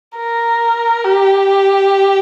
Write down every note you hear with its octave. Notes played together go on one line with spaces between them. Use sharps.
A#4
G4